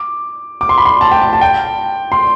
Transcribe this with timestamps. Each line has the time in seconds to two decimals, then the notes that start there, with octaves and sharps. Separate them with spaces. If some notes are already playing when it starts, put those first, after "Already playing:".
Already playing: D6
0.61 D6
0.69 C6
0.78 B5
0.85 C6
1.01 A5
1.11 G5
1.22 A5
1.33 A5
1.41 G5
2.12 C6